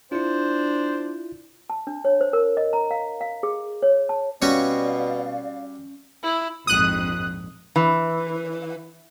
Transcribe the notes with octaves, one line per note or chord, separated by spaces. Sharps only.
D4 E4 F4 C5
A5
D4
C#5
C5
A#4
D#5
A#5
F5
F5
G#4
C#5
A5
B2 G3 C#4 F#4 C#5 D5 F5
E4
A#1 F2 G#2 D#6 F#6
E3